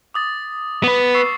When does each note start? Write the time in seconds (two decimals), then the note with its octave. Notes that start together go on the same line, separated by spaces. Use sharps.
0.14 D6 D#6 A6
0.83 B3 B4 D#6
1.14 C#6 E6 C7